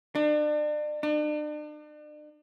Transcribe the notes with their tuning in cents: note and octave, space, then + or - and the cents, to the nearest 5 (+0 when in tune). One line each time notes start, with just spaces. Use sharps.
D4 +35
D4 +40